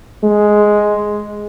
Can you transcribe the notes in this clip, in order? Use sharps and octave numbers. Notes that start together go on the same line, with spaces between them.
G#3